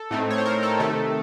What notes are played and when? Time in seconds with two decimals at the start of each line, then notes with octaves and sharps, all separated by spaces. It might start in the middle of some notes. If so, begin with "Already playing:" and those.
Already playing: A4
0.11 A2 A3 C4 D#4
0.30 C#5
0.38 C5
0.46 A#4
0.63 A4
0.80 C3 D#3 A3